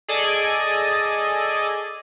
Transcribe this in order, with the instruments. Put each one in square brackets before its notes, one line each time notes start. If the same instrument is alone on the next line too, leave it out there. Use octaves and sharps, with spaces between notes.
[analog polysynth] G#4 A4 D5 D#5 G#5